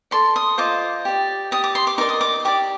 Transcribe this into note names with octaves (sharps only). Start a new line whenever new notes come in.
A4 D5 C6
D#6
F4 C5 D#5 D6
G4 D5
G4 D5 D#6
D6
C6
D6
D#4 A#4 D5 D6
D#6
D6
G4 D5 D6